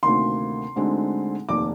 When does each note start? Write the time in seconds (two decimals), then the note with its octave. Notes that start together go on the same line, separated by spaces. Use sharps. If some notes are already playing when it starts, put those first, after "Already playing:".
0.03 D2 C3 D#3 A#3 C6
0.76 D2 D3 G#3 C4 D#4
1.49 F1 D#2 D#3 D6